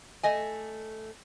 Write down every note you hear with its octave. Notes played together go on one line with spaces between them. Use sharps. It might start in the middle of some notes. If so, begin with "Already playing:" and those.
A3 D#5 G#5